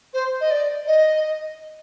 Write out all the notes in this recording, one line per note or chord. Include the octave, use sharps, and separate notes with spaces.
C5
D#5
D5
D#5